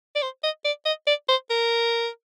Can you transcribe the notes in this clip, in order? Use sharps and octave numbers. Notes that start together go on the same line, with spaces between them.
D5
C5
D#5
D5
D#5
D5
C5
A#4